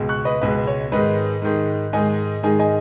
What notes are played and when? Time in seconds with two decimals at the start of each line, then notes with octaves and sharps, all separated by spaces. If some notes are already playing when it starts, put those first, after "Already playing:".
Already playing: C#2 B2 G#3
0.09 C#6 F#6
0.25 B4 D#5
0.41 C#2 B2 G#3 B4 D#5
0.67 C#5
0.92 G#2 D#3 G#3 B4 D#5
1.42 G#2 D#3 G#3
1.93 G#2 D#3 G#3 D#5 G#5
2.43 G#2 D#3 G#3 D#5 G#5
2.59 D#5 G#5